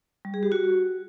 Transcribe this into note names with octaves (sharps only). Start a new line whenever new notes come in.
G3
G#4
G4
F#4